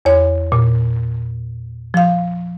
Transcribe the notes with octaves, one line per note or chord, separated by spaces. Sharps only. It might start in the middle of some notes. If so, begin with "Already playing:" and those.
E2 C#5
A#2
F3 F5